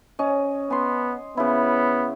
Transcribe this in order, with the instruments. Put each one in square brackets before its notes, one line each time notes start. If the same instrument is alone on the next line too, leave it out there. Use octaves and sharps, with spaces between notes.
[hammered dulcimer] C#4 D#5
[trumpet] B3 [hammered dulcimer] G#5 C6
[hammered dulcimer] C#3 E4 [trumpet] B3